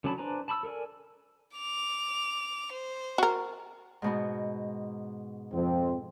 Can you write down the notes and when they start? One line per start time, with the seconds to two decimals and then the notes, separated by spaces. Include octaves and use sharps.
0.04 D3 F#3 C#4 A5 B5
0.18 D4 B4 C5 G#5 A#5
0.48 A5 B5 C#6 E6
0.63 A4 A#4 D5 G#5
1.57 D6 F7
2.72 C5
3.18 F#4 A#4
4.02 G#2 B2 B3
5.53 F2 C4